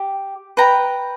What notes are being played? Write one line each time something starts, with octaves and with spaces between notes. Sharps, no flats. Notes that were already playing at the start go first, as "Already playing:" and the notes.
Already playing: G4
B4 G5 A#5